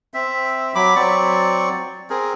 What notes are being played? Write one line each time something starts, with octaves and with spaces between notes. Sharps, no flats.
C4 E5
F#3 B5 D6
F#3 C4 D5 C#6
C4 G#4 A#4